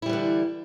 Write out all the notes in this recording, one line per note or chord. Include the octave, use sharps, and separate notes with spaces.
D3 E3 G3 E4